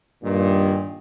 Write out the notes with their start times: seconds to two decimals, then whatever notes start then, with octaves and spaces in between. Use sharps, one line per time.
0.23 G2 A#2 D#3